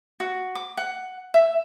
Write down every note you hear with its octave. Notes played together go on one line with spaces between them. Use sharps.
F#4
D6
F#5
E5